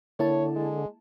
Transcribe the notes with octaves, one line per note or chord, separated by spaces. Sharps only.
D3 A#3 E4 C#5 A5
G#3